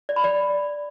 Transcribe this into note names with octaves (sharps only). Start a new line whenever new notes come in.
D5
B5
D5